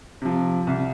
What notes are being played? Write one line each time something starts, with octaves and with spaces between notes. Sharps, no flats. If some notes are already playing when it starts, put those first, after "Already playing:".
C3 F3
C2